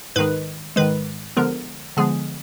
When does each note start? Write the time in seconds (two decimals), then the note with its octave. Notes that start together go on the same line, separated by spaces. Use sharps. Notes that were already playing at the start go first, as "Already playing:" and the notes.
0.16 G#2 D#3 G#3 B4
0.76 G#2 D#3 G#3 B4
1.37 D3 F3 G#3 B3 A#4
1.97 D3 F3 G#3 B3 G#4